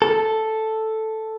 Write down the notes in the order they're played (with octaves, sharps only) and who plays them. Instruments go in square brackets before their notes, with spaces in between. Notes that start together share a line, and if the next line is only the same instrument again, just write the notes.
[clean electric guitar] A4